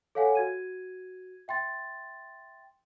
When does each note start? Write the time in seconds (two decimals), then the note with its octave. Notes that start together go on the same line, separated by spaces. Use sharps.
0.15 A4 C#5 F5 F#5 G#5
0.35 F#4 G#6 D#7
1.48 E5 G5 C6 A6